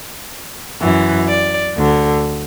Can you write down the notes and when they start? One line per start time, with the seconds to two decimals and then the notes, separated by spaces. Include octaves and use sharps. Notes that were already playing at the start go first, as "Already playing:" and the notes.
0.81 F#2 E3
1.28 D5
1.76 D2 D3